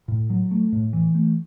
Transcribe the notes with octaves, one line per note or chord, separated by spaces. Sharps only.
A2
F#3
A3
A2
E3
A3